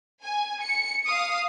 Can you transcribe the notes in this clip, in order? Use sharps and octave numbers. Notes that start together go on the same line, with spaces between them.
G#5
C#7
F5 D#6